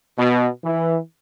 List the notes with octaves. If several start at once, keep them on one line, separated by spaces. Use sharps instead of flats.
B2
E3